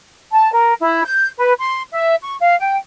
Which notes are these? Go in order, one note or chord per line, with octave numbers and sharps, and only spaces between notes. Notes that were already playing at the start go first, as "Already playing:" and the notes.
A5
A#4
E4
G6
B4
C6
E5
C#6
F5
G5